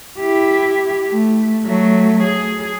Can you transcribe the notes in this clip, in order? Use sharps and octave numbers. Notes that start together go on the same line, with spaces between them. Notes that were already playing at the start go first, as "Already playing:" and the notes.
E4 G4
A3
F#3 A3
G#4